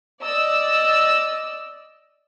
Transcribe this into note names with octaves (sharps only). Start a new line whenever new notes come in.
D5 D#5 E6